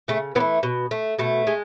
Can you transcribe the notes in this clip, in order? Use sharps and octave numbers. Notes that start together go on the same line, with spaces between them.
C#3 A3
E3 B3
A3
B2
A3
B2 A3
G#3